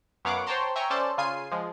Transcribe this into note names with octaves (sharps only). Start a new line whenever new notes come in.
F#2 B3 C#5 F5 F#5 D6
C5 C#5 G5 A5 A#5 C6
E5 G5 G#5 A#5 C#6
C#4 A4 C5 D5 A5
C#3 F4 G#5 C7 D#7
F3 G#3